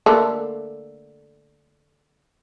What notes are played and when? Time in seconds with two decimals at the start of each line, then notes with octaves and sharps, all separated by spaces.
0.06 D3 A3 A#3